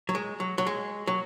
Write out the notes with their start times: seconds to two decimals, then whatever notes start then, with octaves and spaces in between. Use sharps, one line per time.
0.09 F#3
0.15 G#3
0.40 F#3
0.58 F#3
0.67 G#3
1.07 F#3